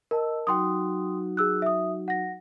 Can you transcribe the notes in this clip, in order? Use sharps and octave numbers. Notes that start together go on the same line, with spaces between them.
A#4 D#5 A5 E6
F#3 D#4 F#4 G5 C6 D#6
G#4 E6 F#6
E5 D#6
F#5 A#6